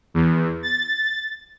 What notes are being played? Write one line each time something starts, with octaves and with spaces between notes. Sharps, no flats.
E2
A6